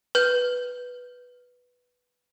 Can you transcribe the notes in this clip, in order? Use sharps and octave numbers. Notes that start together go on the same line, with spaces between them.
B4 G6